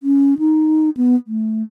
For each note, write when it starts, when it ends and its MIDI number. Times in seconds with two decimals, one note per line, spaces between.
0.03 0.34 61
0.39 0.90 63
0.97 1.16 59
1.27 1.62 57